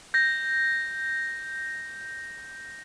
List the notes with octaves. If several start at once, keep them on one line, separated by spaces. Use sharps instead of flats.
G6 A#6